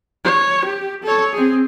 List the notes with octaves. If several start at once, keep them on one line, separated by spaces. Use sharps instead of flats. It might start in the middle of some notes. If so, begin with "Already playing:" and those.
C#5
G4
A4 C#5
C4 G#4